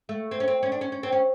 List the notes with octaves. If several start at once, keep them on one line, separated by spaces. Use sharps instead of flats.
A3
C4
C#4
C4
C#4
D4
C#4
C#4
C4
C#4